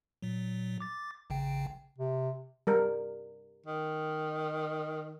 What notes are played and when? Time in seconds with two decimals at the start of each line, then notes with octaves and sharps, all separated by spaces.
0.22 A#2 F#3
0.80 D6 A6
1.30 A1 C#3 G5
1.98 C3
2.67 G3 A#4
3.66 D#3